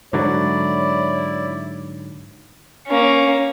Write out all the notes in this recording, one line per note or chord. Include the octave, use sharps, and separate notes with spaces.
G#2 D3 F#3 E4 C#5 D5
A#3 C#4